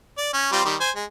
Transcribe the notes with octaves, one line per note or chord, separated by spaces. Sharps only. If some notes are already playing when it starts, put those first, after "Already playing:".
D5
C#4
G3 C4 F4
D#3 G3
C5 G#5
G#3